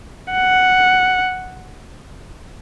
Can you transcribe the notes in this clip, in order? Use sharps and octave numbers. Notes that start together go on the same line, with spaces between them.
F#5